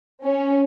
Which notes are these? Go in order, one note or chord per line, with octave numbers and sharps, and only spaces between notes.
C#4